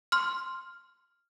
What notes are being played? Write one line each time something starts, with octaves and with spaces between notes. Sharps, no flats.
C6 F6